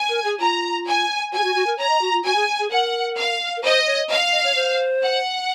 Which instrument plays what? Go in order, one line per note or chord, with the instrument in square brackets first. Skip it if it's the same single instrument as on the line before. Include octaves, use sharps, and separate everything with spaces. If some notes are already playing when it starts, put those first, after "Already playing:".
Already playing: [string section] G#5
[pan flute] A#4
G#4
[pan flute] F4 [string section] A#5
[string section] G#5
[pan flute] F#4 [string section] G#5
[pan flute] G#4
F#4
F#4
A#4
[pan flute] C#5 [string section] A#5
[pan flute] D#5
F#4
F4
[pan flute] F#4 [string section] G#5
[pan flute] G#4
G#4
[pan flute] A#4 [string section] F#5
[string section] F5
[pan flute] A#4
[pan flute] C5 [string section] D#5
[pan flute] C#5
[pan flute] D#5 [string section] F5
[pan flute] D#5
C#5
C5
[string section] F#5